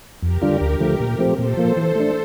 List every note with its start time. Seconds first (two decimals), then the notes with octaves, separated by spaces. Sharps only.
0.22 F2 G4 A#4
0.42 D3 G3 D4 F4
0.61 D2
0.80 D3 F3 A3
1.00 A#2
1.18 F3 A3 C4 G4
1.38 A#2 A4 C5
1.57 F3 A#3
1.76 E3 A4 C5
1.96 A3 D4